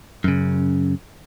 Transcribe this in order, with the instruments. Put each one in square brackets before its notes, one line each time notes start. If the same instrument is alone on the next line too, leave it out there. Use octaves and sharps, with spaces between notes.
[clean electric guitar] F#2 C#3